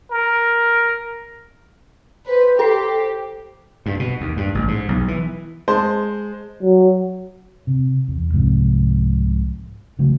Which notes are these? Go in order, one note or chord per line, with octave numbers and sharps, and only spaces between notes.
A#4
B4 C5
G4 A4 C7
G2
B2
D#2
G2
A1
G#2
B1
E3
G#3 C5 A5
F#3
C3
E2
C2 G#2 C3 F3
C#3 E3 F#3 A3